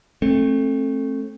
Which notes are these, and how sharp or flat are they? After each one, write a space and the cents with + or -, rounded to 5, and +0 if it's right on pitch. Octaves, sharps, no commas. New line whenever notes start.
A3 +0 C4 +35